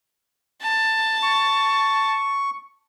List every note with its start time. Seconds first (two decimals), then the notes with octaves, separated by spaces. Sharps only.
0.62 A5
1.23 C#6